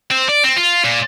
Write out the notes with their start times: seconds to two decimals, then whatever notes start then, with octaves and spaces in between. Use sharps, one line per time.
0.11 C4
0.29 D5
0.44 C4
0.56 F4
0.84 A#2